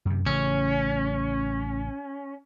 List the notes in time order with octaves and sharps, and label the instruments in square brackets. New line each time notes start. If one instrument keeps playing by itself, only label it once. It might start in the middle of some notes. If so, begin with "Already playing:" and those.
[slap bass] F#2 C3
[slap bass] A1 C#3 A3 [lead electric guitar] C#4